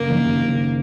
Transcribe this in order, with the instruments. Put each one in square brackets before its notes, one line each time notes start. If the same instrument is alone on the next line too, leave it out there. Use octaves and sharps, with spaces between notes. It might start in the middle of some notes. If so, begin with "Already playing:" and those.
Already playing: [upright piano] F#1 [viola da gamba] A#3
[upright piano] D#3
F#1
F#1